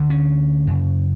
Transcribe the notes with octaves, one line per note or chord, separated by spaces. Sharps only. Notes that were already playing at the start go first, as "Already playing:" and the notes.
Already playing: D2 D3
C#4
F#2 C#3